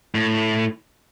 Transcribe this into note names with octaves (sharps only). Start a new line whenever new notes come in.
A2